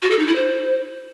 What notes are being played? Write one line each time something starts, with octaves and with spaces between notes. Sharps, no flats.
F#4
A4
D#4
E4
C5